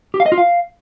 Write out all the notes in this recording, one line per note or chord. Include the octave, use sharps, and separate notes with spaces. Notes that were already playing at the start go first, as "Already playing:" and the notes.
G4
F5
D#5
F4
F5